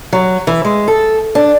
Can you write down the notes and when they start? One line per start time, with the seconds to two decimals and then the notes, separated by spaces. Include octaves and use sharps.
0.13 F#3
0.47 E3
0.65 G#3
0.88 A4
1.35 D4